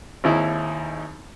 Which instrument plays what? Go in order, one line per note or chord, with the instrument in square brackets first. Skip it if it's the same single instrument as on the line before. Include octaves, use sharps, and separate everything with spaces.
[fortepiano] G#1 D#2 D#4 E4